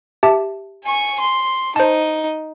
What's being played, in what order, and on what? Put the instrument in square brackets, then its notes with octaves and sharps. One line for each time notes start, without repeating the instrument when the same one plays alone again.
[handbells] G4 E5 A5
[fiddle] G#5 C#6
C6
[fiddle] D#4 [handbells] C5 A5